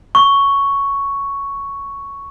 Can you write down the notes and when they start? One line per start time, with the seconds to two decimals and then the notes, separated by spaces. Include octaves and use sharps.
0.15 C#6